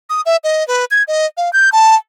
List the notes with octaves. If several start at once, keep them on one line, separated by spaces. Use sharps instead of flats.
D#6
E5
D#5
B4
G#6
D#5
F5
G6
A5